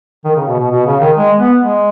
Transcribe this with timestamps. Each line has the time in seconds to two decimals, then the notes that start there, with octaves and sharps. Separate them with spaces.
0.25 D#3
0.36 C#3
0.48 B2
0.59 B2
0.71 B2
0.86 C#3
1.01 D#3
1.16 G#3
1.39 B3
1.61 G#3